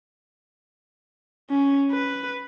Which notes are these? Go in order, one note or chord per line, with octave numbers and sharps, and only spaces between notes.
C#4
B4